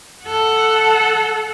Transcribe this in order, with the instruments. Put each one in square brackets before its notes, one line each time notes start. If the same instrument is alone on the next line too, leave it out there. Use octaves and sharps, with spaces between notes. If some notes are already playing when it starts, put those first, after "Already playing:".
[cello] A4 F#5